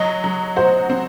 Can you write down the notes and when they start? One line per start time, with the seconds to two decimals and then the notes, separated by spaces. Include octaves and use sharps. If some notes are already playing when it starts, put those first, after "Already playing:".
Already playing: F#3 D#5
0.24 F#3
0.56 F#4 C5
0.90 C4